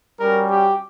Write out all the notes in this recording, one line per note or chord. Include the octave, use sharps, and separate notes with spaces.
G3 C#4 F#4 A#4
G4